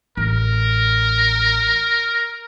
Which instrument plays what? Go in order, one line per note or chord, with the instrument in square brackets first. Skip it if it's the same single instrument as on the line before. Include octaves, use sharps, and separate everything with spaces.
[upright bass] A1 [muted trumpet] A#4